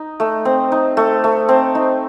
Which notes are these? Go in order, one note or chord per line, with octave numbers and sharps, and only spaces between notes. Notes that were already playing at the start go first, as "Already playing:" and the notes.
Already playing: D#4
A3
C4
D#4
A3
A3
C4
D#4